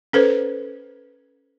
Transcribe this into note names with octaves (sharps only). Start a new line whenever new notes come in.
C#4 A4 B4 C5